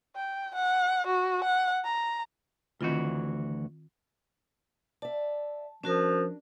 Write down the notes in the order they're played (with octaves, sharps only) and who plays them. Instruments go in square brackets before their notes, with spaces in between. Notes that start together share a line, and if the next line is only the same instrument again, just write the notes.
[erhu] G5
F#5
F#4
F#5
A#5
[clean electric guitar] D2 E3 F#4 [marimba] D#3 C4 F4
[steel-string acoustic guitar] D5 E5 [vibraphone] A5
[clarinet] F3 [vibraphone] C#4 F#4 A#4 [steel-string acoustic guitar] D4